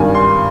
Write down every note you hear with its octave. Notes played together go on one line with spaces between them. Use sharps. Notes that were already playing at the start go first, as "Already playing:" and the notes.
Already playing: G#1 G2 D#3 G#5
C6